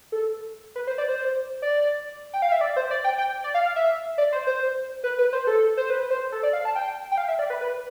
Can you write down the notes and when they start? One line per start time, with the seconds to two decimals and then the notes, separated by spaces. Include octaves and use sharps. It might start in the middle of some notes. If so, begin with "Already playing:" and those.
0.12 A4
0.76 B4
0.87 C5
0.98 D5
1.08 C5
1.62 D5
2.33 G5
2.42 F5
2.52 E5
2.61 D5
2.76 C5
2.91 D5
3.04 G5
3.18 G5
3.44 D5
3.54 F5
3.65 F5
3.76 E5
4.18 D5
4.32 C5
4.47 C5
5.04 B4
5.18 B4
5.33 C5
5.47 A4
5.77 C5
5.90 B4
6.10 C5
6.32 A4
6.43 D5
6.53 F5
6.65 A5
6.75 G5
7.12 G5
7.18 F5
7.28 E5
7.39 D5
7.50 B4
7.61 B4